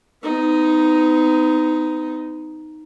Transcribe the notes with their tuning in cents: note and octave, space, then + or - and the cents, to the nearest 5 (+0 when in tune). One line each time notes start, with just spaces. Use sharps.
B3 +40 D#4 +0